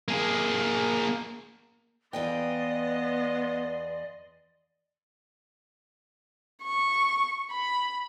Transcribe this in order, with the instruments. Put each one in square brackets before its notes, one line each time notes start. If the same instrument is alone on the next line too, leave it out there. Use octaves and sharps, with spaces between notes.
[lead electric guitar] A#3 G#4
[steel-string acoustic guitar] E2 F5 G5 [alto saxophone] B3 [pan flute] D5 [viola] D#5 C6
[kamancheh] C#6
B5